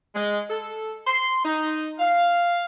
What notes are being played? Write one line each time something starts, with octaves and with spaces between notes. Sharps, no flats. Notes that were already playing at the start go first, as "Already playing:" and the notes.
G#3
A4
C6
D#4
F5